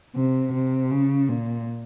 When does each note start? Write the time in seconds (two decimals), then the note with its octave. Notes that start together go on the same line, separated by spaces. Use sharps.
0.16 C3
0.53 C3
0.91 C#3
1.29 A#2